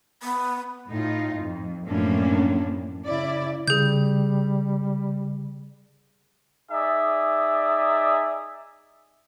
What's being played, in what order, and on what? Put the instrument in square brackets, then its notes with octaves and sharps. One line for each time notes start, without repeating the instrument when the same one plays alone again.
[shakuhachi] B3
[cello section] A2 D#4 F4
F2
F#2 A2 F3 A#3 C#4 D4
C#3 E4 D5
[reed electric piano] C#3 [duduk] G3 [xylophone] G#4 G6
[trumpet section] D#4 G#4 D5 E5